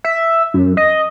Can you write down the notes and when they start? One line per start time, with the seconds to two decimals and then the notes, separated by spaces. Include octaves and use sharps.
0.04 E5
0.54 F#2
0.77 D#5